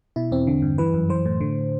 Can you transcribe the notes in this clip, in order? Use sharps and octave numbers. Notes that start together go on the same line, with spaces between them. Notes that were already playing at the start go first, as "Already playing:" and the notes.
B2 E4
E2 C4
D3
G2
E3 B4
F#2
E3 C5
A2
D3